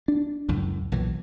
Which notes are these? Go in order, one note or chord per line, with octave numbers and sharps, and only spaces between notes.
D4
C#2 F#2 A2
B1 A#2 E3